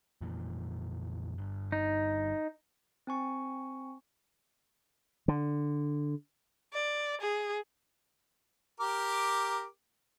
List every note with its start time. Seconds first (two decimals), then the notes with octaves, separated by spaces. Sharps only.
0.21 F2 A#2 E3
1.38 G1 G2
1.72 D#4
3.07 C4 G#5 C#6
5.28 D3
6.73 D5
7.21 G#4
8.80 G4 A#4 D6